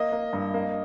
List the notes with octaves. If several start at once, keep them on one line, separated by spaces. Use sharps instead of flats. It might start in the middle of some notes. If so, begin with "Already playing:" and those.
Already playing: A#3 D#5
A#3
G2
A#3